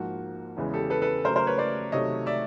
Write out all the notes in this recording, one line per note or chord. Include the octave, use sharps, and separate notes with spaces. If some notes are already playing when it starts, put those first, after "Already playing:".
Already playing: G#2 F3 A#3 F#4
E2 C#3 E3 G#3 B3
G4 A4
A4 B4
A4 B4
C#3 F#3 A3 A#4 C5
A#4 C5
B4 C#5
C5 D5
C3 D#3 F#3 A3 C#5 D#5
D5 E5